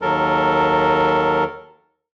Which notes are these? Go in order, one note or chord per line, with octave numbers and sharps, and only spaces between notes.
D#2 F#3 A4 A#4